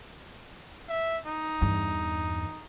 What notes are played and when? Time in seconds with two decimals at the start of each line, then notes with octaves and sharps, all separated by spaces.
0.88 E5
1.25 D#4
1.61 E2 G2